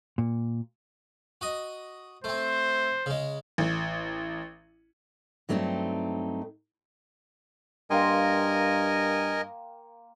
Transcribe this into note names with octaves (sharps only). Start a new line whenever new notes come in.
A#2
F#4 D#5
A3 C4 C5
C#3 G#3
A1
G2 F#3 A3 C4 C#4 D#4
G2 A#3 A#4 D#5 G5 G#5 C6